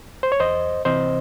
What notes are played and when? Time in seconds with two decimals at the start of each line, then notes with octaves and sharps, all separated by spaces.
0.23 C5
0.32 C#5
0.40 E2 C5 D#5
0.85 C3 E3 C4 C5 D#5